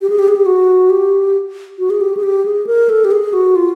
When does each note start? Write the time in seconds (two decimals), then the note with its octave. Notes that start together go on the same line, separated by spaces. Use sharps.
0.02 G4
0.10 G#4
0.19 G4
0.28 G#4
0.36 G4
0.46 F#4
0.90 G4
1.78 F#4
1.90 G#4
2.01 G4
2.17 G#4
2.23 G4
2.45 G#4
2.67 A#4
2.89 A4
3.05 G4
3.11 G#4
3.33 F#4
3.56 F4